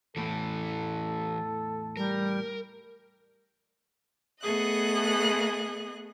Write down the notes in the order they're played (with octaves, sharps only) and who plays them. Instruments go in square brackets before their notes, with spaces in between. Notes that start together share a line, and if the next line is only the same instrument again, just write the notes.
[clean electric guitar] E2 A2 [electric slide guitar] E3 A3 [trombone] A4
[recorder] G3 [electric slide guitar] A#4
[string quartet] A3 B3 G#4 D#5 F#6